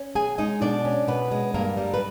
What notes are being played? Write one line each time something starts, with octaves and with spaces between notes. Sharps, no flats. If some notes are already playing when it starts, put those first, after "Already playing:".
Already playing: C#4
B2 G#4 G#5
G#3 D#4 D#5
B2 D4 D5
C#4
B2 B3 B4
G#3
G2 A#3 A#4
G3
B4